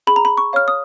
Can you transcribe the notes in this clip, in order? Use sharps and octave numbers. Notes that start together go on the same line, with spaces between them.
G#4 B5
A#5
B5
C#6
C#5 F5 F6
D#6